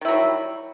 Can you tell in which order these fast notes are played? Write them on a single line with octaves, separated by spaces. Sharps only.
D#3 E4 F#3 G3